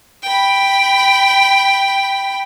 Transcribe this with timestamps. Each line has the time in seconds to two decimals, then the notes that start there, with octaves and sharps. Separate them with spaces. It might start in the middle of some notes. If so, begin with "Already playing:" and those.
0.23 G5 B5